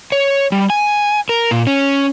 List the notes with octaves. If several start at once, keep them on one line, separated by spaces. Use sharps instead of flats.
C#5
G3
G#5
A#4
A#2
C#4